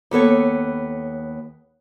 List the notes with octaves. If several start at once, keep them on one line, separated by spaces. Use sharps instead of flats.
D#2 B3 A4 C#5